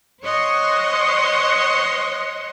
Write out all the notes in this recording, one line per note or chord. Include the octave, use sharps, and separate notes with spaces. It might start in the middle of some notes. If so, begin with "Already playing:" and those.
C5 C#5 D#5 F#5 C6 C#6